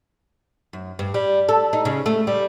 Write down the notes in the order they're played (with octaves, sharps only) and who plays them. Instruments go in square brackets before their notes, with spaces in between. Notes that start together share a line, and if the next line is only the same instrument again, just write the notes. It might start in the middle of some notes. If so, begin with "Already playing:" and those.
[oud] F#2
G2
G3
A4
D#4
C#3
A3
G3